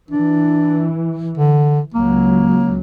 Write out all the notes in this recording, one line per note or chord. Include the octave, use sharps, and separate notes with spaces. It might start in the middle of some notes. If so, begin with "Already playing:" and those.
E3 D4
D3
C#2 F#3 A#3